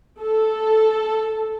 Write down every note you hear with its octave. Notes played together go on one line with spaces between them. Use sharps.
A4